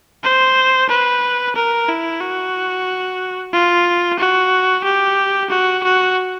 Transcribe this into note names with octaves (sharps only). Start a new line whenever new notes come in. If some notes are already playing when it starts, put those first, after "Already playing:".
C5
B4
A#4
E4
F#4
F4
F#4
G4
F#4
F#4